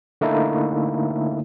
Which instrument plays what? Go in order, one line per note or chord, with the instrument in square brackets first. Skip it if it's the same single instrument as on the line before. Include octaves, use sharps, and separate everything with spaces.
[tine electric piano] D3 A3 A#3 D#4 E4 A4